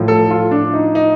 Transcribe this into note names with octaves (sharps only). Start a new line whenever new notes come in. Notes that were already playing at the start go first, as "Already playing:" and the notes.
Already playing: A2 F3
A4
F4
D4
D#4
D#4